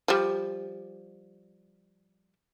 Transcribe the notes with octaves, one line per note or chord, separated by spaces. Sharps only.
F3 G3